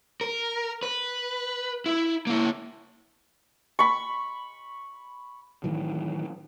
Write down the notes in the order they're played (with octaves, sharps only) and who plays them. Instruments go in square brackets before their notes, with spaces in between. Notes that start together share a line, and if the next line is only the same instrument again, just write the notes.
[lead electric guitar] A#4
B4
E4
A#3 E4
[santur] B5 C#6
[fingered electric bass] A2 D#3 E3 F#3